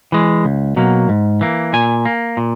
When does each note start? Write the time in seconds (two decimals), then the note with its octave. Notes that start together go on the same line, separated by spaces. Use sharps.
0.12 E3 G#3
0.45 C#2
0.76 B2 F#3 A#3
1.09 G#2
1.41 E3 A#3
1.73 A#2 G#5
2.05 A#3
2.37 A#2